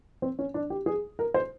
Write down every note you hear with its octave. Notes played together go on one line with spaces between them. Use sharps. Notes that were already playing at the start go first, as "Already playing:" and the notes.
C4
C#4
D4
G4
G#4
A#4
C5